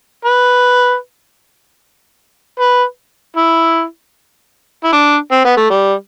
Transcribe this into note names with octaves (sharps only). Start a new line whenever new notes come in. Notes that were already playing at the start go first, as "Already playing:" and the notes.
B4
B4
E4
E4
D4
C4
B3
A3
G3